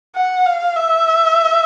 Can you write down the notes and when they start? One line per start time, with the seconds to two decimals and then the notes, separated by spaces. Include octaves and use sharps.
0.15 F#5
0.46 F5
0.76 E5